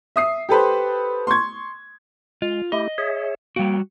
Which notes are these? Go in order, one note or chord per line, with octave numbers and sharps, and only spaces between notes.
E5 D#6 C7
G4 A4 B4 C5
C6 C#6 G#6
G#3 F4
A3 E4 G4 D#5
G#4 C#5 E5
G3 A#3 F#4 G5